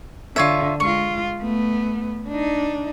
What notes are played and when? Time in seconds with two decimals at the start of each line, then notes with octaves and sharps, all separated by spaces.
0.36 D3 F4 C#5 E5
0.80 G#3 F4 C#6
1.40 A3 B3
2.29 D4 D#4